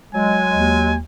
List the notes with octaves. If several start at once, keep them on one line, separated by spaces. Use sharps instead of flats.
F#3 G#3 G#5
D#2